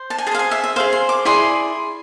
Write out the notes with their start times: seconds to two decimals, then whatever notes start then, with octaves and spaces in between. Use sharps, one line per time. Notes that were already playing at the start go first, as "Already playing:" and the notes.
Already playing: C5
0.10 A5
0.18 G#5
0.27 G#4 A5
0.31 C5 F5
0.39 G#5
0.51 E5
0.64 E5
0.76 G#4 C5 F5
0.93 C6
1.09 D6
1.25 E4 G#4 D5 C6